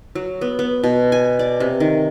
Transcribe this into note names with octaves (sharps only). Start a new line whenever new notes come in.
F#3
B3
B3
B2
G#5
D5
C3
D#3